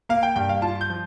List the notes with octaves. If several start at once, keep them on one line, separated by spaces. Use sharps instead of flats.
A#3 F5
G5
G2 G5
F5
F4 A5
G6
F3